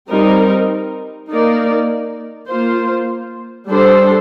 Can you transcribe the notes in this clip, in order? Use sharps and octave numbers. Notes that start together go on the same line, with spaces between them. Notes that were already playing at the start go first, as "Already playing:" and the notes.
G3 C4 D#4 A#4
A#3 D#4 A#4 D5
A#3 F4 C5
G3 D4 A4 C5